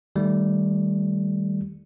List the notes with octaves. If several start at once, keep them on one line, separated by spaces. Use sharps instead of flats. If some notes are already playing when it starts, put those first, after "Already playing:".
D#3 G3 A3